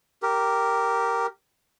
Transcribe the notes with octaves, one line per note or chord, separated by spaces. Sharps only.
G4 A#4